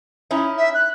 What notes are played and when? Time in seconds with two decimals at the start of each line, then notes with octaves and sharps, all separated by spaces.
0.31 C#4 D#4 E4
0.58 E5
0.74 F#6